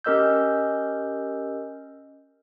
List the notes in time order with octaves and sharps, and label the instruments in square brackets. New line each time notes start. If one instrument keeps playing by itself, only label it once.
[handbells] C#4 G4 A#4 D#5 E6 G6